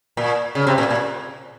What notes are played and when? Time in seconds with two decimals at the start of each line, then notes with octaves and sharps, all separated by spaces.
0.17 A#2
0.55 C#3
0.67 C3
0.78 A#2
0.90 A#2